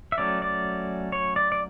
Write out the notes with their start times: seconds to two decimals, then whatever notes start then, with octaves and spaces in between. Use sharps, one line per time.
0.12 E5
0.18 F#3 A3 C#4 D5
0.42 D5
1.12 C#5
1.36 D5
1.52 D5